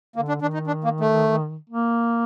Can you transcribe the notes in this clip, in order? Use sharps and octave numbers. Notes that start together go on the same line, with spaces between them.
D3 A#3
D4
D#3 D4
D#4
D4
A#3
A3
A#3